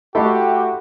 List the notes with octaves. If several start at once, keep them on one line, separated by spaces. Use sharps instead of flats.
A3 E4 F#4 G4 A4 B5 C6